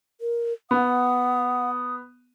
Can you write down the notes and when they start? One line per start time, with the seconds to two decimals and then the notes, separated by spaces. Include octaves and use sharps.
0.21 A#4
0.71 B3 F#5 D#6